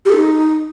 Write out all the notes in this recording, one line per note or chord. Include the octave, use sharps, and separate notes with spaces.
G4
A4
D#4